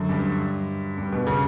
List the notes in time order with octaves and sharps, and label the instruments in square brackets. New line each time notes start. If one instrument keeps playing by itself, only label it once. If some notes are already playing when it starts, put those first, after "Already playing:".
Already playing: [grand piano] F#2 D3
G2
G2
B2
C#3